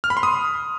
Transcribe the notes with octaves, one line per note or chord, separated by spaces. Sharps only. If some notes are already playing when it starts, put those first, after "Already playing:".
F6
B5
C6
D#6